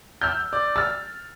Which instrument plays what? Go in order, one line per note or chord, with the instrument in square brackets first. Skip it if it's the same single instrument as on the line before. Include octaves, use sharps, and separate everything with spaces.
[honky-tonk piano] E6 F6 G6
[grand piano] D5
[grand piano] E6 F6 [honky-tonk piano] A6